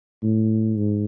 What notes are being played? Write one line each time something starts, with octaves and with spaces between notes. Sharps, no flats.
A2
G#2